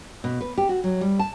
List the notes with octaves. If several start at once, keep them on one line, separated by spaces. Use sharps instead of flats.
B2
B4
G4
F#4
F#3
G3
A5